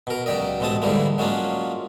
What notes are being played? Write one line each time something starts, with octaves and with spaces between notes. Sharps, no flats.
B2 A#4
C#2 F#3 G4 D5 D#5
A1 B2 G#3 C4 A5 D#6
G#2 D3 E3 G3 G#3 A#3
F#3 G#3 A#3 C#4 D4 F4